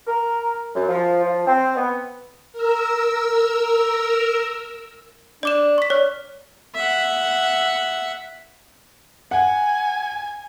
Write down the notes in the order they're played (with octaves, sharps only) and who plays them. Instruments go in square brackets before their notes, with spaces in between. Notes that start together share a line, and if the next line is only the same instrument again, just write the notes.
[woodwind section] A#4
F#2
F3
F3
C4
B3
[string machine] A#4 E6
[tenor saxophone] D4 [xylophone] D5 D6 E7
[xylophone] C#6 B6
[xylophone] C#5 F6 [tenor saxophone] D5
[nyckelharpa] E5 F#5
[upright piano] F#5 [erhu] G#5